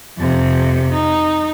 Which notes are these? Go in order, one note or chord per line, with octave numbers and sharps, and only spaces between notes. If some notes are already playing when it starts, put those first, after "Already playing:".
F2 C3
D#4